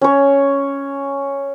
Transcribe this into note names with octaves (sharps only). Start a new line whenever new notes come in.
C#4 C#5